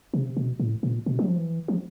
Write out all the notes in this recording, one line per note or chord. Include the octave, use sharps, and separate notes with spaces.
C3
B2
A2
A#2
B2
F#3
F3
E3
F3